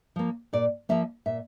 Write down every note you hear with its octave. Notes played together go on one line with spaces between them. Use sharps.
F3 A#3
A#2 D5
F3 A#3 E5
A#2 E5